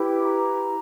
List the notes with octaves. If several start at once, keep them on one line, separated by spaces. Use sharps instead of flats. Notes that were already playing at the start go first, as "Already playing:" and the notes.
Already playing: E4 G4 B4
A#5